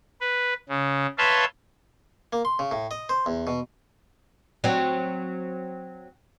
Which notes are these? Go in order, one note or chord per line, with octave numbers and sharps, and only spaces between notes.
B4
C#3
B4 C#5 E5 F5 A5 C6
A#3
C6
C#3
A2
D#5
C5
E2
B2
F#3 C4